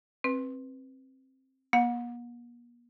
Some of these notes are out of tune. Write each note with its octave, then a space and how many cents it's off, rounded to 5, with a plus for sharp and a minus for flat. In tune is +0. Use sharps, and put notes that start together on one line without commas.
C4 +15 B4 +0
A#3 +45 F#5 -40